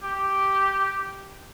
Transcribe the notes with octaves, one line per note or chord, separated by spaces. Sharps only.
G4